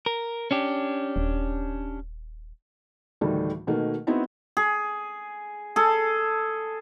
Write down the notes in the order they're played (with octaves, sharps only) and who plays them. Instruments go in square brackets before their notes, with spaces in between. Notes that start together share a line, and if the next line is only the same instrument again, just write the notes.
[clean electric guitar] A#4
C#4 D4 G4
[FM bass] D#1
[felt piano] D2 A2 D#3 E3 G3 A3
B2 D#3 A3 A#3
B3 C4 D#4 E4 F#4
[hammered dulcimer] G#4
G#4 A4